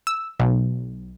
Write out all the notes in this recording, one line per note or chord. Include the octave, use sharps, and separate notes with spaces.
E6
B1